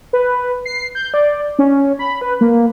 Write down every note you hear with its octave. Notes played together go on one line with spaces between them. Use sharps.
B4
C7
G6
D5
C#4
B5
B4
A#3